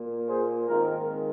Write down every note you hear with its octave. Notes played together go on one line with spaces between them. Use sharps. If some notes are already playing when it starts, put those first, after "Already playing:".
Already playing: A#2 A#3
G#4 C5
G#2 D#3 G#3 C4 F4 A#4